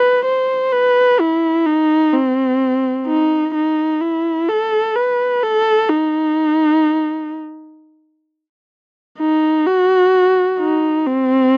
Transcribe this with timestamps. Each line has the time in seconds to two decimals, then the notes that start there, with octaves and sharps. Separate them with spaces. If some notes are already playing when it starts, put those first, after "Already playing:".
Already playing: B4
0.25 C5
0.73 B4
1.20 E4
1.67 D#4
2.14 C4
3.07 D#4
3.55 D#4
4.01 E4
4.49 A4
4.96 B4
5.43 A4
5.90 D#4
9.19 D#4
9.67 F#4
10.60 D#4
11.07 C4